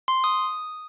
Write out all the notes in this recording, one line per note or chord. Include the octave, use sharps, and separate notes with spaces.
C6
D#6